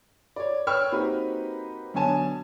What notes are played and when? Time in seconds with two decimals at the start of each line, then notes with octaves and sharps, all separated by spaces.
0.36 C#5 D5
0.67 B4 C#5 G5 C#6 E6 F6
0.92 A#3 C4 D#4 F#4 G4 B4
1.94 B1 D3 B3 C#5 G#5 A5